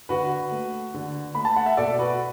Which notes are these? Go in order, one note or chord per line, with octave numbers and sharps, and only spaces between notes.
D3 F#4 B4
A3
D3
A3 B5
A5
F#5
E5
B2 A4 D5
F#4 B4